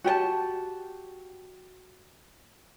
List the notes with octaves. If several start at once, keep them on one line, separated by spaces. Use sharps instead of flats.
F#4 G4 G5 A5